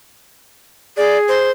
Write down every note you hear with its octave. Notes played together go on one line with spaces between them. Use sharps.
G#4 D5
C5